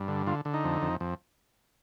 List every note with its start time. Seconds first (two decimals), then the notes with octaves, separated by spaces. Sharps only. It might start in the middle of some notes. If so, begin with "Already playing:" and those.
Already playing: G2
0.08 D3
0.27 D3 F4
0.45 D3
0.54 D#4
0.64 F2
0.82 F2
1.00 F2